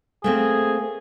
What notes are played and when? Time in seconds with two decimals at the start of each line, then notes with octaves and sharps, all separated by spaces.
0.24 A3 A#3 C4 G#4